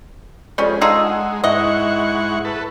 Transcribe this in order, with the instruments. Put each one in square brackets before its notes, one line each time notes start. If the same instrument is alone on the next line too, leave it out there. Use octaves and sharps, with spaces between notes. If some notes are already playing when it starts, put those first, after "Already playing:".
[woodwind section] F2 [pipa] G3 C#4 [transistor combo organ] G#3
[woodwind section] D3 A5 E6 [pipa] D#4 F4 G#4
[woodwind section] F#5
[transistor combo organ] G#2 F#5 C#6 [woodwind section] E4 [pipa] D#5
[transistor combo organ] A4 B4